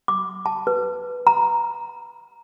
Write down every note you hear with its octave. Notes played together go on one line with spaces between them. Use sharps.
D6
A5
B4
A#5